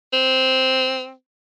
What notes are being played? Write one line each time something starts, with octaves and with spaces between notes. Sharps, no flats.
C4